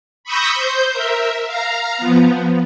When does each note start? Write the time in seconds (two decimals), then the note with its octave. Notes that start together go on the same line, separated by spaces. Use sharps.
0.24 B5 C#6 D#6 E6 G6 A#6
0.54 C5 G6
0.92 A#4 E5
1.45 F5 A#5
1.98 F3 B3